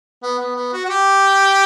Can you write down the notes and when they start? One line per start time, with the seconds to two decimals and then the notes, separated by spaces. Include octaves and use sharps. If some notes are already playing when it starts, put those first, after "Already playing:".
0.23 B3
0.39 B3
0.56 B3
0.73 F#4
0.85 F#4
0.89 G4